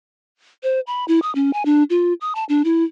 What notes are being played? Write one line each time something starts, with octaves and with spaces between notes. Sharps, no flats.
C5
B5
E4
D#6
C#4
G#5
D4
F4
D#6
A5
D4
E4